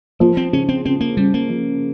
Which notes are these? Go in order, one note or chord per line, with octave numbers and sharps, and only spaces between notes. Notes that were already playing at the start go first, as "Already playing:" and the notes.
F3 A#3
C4
C#3 C#4
C4
C#3 C4
A#3
C#3 G3
A#3
F3